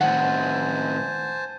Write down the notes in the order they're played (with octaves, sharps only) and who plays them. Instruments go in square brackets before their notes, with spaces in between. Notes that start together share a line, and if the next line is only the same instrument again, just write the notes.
[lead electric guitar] A2 D#3 [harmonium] C5 G#5 A5 [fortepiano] F#5